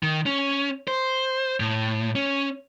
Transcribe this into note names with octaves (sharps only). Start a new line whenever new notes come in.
D#3
C#4
C5
A2
C#4